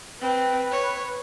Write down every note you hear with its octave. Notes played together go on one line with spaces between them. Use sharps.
C4 B4
C#5